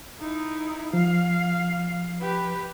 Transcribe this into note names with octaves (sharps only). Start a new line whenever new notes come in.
D#4 E4
F3 F5
G4 B4